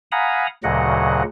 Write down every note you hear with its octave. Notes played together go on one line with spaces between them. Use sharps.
F5 F#5 G#5 A#5 B5 D#6
D2 A#2 C#3 F#3 D#5 F#5